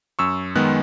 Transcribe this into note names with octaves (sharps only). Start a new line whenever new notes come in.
F#2 C#6 E6
D#3 G#3 B3 F#6